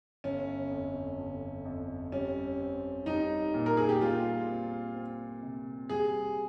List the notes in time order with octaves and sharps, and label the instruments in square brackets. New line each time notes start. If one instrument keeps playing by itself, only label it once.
[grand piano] G1 [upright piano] C#4
[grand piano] F2
G1
F2
[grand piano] G3 [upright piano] C#4
[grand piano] C4
[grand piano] G3 [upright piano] D#4
[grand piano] A#2
[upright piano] A#4
G#4
G4
[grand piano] G3 [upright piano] F4
[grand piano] C4
C4
C3
[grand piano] G3 [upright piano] G#4